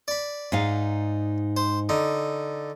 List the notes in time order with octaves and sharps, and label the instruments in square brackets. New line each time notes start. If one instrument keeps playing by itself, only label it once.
[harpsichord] D5 B5
[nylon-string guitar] G#2 D#4 F5
[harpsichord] C5
D3 D#4